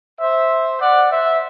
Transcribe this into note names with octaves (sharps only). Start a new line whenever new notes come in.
C5 E5
D5 F#5
C5 E5